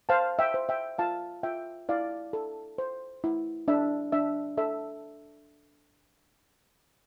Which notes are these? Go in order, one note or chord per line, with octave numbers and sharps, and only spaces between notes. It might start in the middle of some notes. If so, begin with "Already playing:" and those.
C5 F5 A5
E5 G5
C5
E5 G5
F4 F5 A5
F4 E5 G5
E4 D5 F5
A4
C5
E4
D4 E5
D4 E5
A4 E5